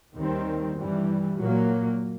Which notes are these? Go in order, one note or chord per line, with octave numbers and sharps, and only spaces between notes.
D#2 D#3 G3 C4
G2 E3 G3
A#2 F#3 A#3